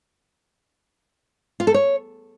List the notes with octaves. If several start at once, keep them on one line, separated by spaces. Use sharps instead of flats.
F4
A4
C#5